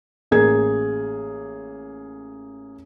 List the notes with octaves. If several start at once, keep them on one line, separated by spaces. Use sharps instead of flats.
A1 A#3 G#4 G#6